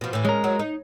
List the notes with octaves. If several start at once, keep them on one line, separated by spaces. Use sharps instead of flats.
B2 F3
A2 E3
G#3 C#4 A#4
F#3
D#4